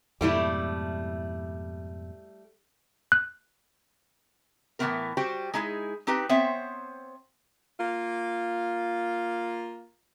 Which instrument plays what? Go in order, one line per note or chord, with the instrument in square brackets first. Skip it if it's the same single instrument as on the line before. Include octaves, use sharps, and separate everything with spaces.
[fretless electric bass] F2 G#2 B2 [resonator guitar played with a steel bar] G3 A3 E4
[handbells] F#6
[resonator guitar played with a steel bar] A2 E3 F#3 B3 C4 A#4
G3 F#4 G4 C5
G#3 D#4 E4 G#4
C4 D#4 G4 B4
B3 C4 C5 C#5 E5
[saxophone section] A#3 F4